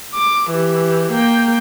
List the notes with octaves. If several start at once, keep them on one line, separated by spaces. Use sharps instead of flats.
D6
E3 G4
A#3 G5